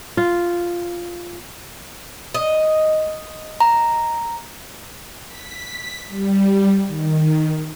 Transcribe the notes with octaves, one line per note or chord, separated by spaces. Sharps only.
F4
D#5
A#5
B6
G3
D#3